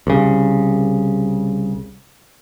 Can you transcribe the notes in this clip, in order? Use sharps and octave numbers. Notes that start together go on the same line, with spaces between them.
C2 C#3